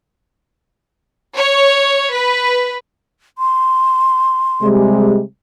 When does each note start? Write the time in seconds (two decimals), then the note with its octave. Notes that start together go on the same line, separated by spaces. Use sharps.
1.36 C#5
2.12 B4
3.38 C6
4.62 C3 G3 G#3